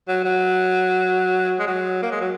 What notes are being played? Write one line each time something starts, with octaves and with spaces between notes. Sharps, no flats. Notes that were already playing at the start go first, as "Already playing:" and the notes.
F#3
F#3
G#3
F#3
A#3
G#3
F#3